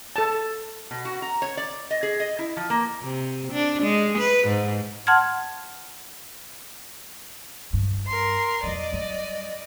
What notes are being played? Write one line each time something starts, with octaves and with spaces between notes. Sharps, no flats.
A4 A5
B2
F#4
A#5
C#5
D5
D#5
G#4
D#5
E4
F3
A#3
C3
D4
G#3
B4
G#2
F#5 A5 C6 F6 G#6
G2
A#4 C6
E2 F3 D5 D#5
F#2 G3